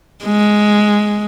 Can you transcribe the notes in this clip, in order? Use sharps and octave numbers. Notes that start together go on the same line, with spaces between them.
G#3